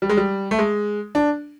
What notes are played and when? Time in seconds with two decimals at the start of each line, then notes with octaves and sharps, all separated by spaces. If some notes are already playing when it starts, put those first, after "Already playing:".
0.02 G3
0.09 G#3
0.17 G3
0.51 A3
0.59 G#3
1.15 D4